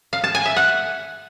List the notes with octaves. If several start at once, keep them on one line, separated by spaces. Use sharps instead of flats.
F5
A5
G#5
E5
F#5